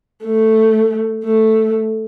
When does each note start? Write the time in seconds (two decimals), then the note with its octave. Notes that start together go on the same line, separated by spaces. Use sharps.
0.25 A3
1.24 A3